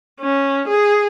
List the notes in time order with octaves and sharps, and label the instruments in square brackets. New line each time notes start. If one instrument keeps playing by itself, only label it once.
[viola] C#4
G#4